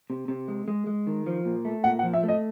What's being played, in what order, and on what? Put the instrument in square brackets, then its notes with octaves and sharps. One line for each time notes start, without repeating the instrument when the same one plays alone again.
[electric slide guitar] C3
C3
G#3
G#3
G#3
D#3
F3
A#2
A3
[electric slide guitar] A#2 [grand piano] F#5
[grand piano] F#5
[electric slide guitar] F3
[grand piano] E5
[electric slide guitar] A3
[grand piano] D#5